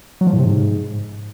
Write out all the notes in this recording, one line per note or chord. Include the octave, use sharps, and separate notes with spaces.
F#3
F3
A2
C3
G#2